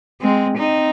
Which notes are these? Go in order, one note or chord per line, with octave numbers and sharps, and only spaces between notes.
G#3 C4
C4 D#4